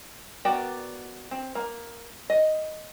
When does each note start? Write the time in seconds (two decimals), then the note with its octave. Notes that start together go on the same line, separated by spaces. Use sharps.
0.45 B3 F#4 A#4 D5 G5
1.31 C4
1.55 A#3
2.30 D#5